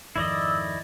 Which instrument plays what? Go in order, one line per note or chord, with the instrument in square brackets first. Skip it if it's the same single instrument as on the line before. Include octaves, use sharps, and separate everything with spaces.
[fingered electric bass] F2 G#2 D#3 [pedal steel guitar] E4 D5 D#5 [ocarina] E6